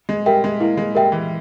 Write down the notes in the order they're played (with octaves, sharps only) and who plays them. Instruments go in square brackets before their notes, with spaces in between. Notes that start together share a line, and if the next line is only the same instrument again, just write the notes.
[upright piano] G#3
[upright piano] G3 [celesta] A#4 E5 G5
[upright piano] G#3
[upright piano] A#3 [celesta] E4
[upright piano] G#3
[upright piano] G3 [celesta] A#4 E5 G5
[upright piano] E3